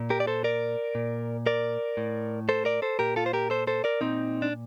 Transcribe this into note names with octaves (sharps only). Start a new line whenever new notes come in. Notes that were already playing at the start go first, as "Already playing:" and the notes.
Already playing: A#2
G4 A#4
D5
A4 C5
A#4 D5
A#2
A#4 D5
A2
A4 C5
A#4 D5
A4 C5
A#2 G4 A#4
F4 A4
C5
G4 A#4
A4 C5
A4 C5
A#4 D5
A#2 C4 D#4
D4